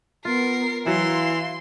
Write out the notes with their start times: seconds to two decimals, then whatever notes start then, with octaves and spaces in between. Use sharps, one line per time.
0.25 B3 F4 A#4 C7
0.87 E3 F#3 F5 C6